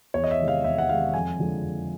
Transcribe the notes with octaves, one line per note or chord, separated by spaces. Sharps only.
E2 C#5
D#5
E5
C3 D#3 G#3
F5
E2 E5
F#5
C3 D#3 G#3 F5
F2 G#5
D3 F3 G#3
F2